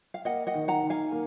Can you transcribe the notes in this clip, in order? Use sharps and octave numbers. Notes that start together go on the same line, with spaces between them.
F5
A#3 D#5 F#5
D#5 F#5
D#3
F#5 A#5
D#3
F5 G#5
A#3